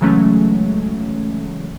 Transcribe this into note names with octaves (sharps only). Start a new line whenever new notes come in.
C#3 E3 F#3 G#3 A3 C#4